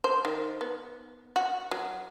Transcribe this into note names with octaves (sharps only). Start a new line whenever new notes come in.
C5
D#3
B3
F#4
F#3